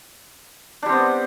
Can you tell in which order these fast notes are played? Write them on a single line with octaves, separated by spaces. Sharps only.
D4 G3 C4 B3